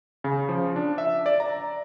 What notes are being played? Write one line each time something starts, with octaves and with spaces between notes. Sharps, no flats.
C#3
F3
D4
E5
D5
A#5